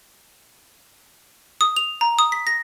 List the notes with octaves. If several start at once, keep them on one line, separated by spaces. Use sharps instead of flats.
D#6
F7
A#5
D#6
B6
A#6